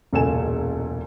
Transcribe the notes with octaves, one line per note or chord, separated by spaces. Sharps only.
E1 C#2 A#2 A4 G#5 E7